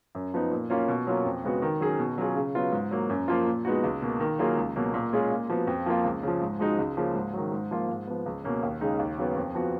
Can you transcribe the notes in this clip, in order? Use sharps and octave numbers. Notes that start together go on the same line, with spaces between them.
F#2
F3 B3 D#4
A#2
F#3 A#3 C#4 F4
B2
F#3 A#3 C#4 F4
F2
C#3 G#3 B3 F#4
D#3
F#3 C#4 G#4
B2
F#3 C#4 F4 G#4
C#3
F#3 B3 F4
G#2
F#3 A#3
F#2
F3 A#3 F4
A#2
G#3 B3 D#4 F#4
C#2
B2 A#3
D#3
F#3 A#3 F4 G#4
C#2
B2 F#3 A#3
A#2
G#3 C#4 F4 G#4
A#2
F3 B3 F#4
F2
F3 A#3 F4
C#2
C#3 F3
G#2
F3 G#3 D#4 F#4
C#2
C#3 F3 A#3
G#2
D#3 F#3
G#2
F3 A#3 F4
G#2
F3 B3
C#2
B2 A#3 C#4
D#2
C#3 G#3 D#4
D#2
C#3 F#3 B3
F2
F3 B3 F#4